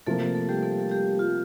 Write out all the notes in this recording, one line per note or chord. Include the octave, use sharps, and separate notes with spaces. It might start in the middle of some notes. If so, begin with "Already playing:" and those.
C3 F3 A3 A#3 A4
A3 A4
G3 G4
A3 A4
A4
G3 G4
F4